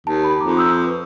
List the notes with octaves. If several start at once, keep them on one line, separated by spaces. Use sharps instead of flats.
D#2 A5
B5
F2 A#5 D6
D#6 E6 G6
B4